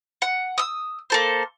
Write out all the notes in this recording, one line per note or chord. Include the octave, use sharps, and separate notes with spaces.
F#5
D#6 E6
A#3 A4 C5